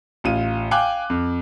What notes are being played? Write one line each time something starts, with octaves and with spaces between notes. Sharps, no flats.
A1 F4 D#7
F5 G5 G#5 D6 F#6
F2